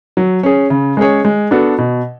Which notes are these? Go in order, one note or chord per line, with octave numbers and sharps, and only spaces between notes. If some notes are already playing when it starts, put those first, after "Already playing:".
F#3
C#4 G#4
C#3
G#3 C#4 G#4 C#5
G#3
B3 D4 F#4 A4
B2